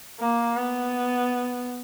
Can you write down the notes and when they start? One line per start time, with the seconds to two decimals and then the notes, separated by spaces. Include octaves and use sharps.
0.20 A#3
0.57 B3